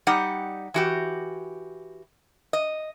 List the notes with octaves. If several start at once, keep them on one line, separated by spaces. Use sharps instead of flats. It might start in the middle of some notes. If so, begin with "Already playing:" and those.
G3 D#4 G4 F#5
E3 F#4 G4
D#5